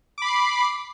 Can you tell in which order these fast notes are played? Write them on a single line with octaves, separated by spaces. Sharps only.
D6 B5 C7